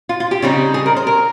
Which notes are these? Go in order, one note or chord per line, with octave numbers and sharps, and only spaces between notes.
F4
F4
G4
C#3 G3 C4 D#4
G#4
A#4
C5
A#4